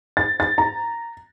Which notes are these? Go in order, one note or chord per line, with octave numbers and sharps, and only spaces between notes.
A6
A6
A#5